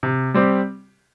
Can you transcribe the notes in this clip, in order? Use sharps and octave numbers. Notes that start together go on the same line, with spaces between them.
C3
G3 C4 G4